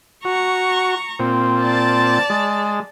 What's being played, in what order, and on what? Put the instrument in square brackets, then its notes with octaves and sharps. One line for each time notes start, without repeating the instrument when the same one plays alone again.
[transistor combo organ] F#4 [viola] A#5 C#6
[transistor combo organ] A#2 C4
[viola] D5 A5
[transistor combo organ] G#3